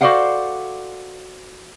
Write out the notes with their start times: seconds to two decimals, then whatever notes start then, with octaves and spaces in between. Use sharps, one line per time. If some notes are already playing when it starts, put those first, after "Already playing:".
0.01 F#4 A4 C5 D5 F5 F#5